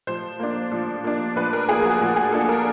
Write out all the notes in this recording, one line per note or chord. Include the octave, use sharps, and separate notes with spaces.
F3 C5
A#3 D4
F3
A#3 D4
F3 B4
A#4
A#3 D4 G#4
F#4
F3
G#4
A#3 D4 A4
A#4